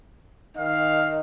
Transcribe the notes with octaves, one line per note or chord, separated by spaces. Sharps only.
D#3 F5